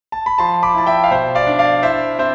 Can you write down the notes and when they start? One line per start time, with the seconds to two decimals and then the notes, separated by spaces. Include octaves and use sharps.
0.12 A5
0.26 B5
0.38 F3 A5 C6
0.63 B5 D6
0.75 E4 A5
0.87 E5 G5
1.04 F5
1.10 B2 C5 E5
1.35 D5 F5
1.47 D4
1.59 D5 F5
1.83 E4 C5 E5
2.19 C4 C5 E5